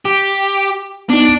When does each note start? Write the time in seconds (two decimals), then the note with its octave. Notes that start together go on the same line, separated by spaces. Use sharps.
0.05 G4
1.10 B3 D4 D#4